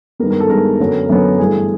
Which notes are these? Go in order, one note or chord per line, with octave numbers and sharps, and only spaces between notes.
G2 D#3 G#3 B3 A#4
A#4
A4
G2 D#3 G#3 B3 A#4
F#2 D3 F#3 B3
F#2 D3 F#3 B3
G2 E3 A3 G#4